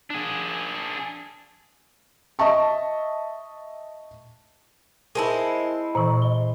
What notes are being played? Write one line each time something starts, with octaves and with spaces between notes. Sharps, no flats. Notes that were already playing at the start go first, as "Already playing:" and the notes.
D4 G#4
D#5 E5 A5 C#6
G#3 C4 E4 A#4 G#5 A5
A#2 E3 C5 C#6
D#5 G7